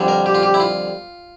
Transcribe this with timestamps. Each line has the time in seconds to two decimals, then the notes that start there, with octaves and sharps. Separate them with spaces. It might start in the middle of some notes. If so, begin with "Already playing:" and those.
Already playing: F2 D3 G3
0.08 A#4
0.26 G4
0.35 F4
0.43 G4
0.54 E4
0.60 F4